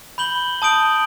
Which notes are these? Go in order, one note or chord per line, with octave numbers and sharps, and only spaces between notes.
B5 G6 F#7 G7
A5 D#6 G6 D7 F#7